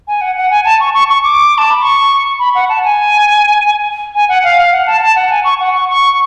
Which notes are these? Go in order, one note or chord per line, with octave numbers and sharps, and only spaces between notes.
G#5
F#5
F#5
G#5
A5
C#6
C#6
C#6
D6
A5
B5
C#6
B5
F#5
A5
G#5
G#5
F#5
F5
F5
F#5
A5
A5
F#5
G#5
C#6
F#5
C#6
C#6